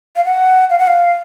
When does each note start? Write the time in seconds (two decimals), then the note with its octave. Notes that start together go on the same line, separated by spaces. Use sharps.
0.16 F5
0.25 F#5
0.70 F5
0.79 F#5
0.87 F5